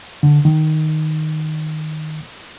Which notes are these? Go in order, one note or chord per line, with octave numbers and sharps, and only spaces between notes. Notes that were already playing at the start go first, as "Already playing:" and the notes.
D3
D#3